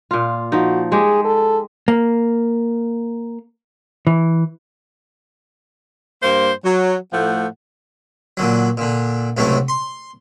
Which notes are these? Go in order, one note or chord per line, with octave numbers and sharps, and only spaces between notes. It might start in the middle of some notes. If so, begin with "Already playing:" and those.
A#2 F4
F3 D#4 F#4
G#3 G4 G#4
A4
A#3
E3
G2 A#3 C5
F#3
A2 F3 A3 F#5
A#2 D3 F#3
A#2 D3
C#2 A2 C3 F#3 A3
C6